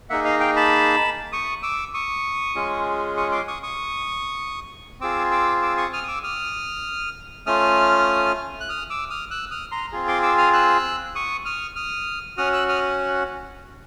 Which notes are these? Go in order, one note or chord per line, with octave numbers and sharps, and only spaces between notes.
A#3 D#4 G#4 E5 F#5
D#5 F5
F5 G5
A5 B5
C#6 D#6
D6 E6
C#6 D#6
G#3 C#4 F4 G#4
C#6 D#6
C6 D6
C#6 D#6
C#6 D#6
C4 F4 G#4 D6 E6
D6 E6
D6 E6
C#6 D#6
D#6 F6
D#6
D6 E6
D#6 F6
A3 C#4 F4 D#6 F6
F#6
D#6 F6
D6 E6
D#6 F6
E6 F#6
D#6 F6
A#5 C6
C4 F4 G#4
C6 D6
D6 E6
D#6 F6
E6 F#6
C#6 D#6
D#6 F6
D#6 F6
C#4 F#4 D#6 F6
E6 F#6
D#6 F6